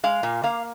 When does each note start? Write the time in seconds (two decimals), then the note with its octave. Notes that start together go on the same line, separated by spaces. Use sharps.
0.04 G#3 F5
0.23 A#2
0.43 A#3 F5